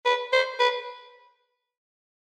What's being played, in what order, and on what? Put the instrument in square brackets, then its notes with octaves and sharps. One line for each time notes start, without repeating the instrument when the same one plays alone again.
[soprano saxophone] B4
C5
B4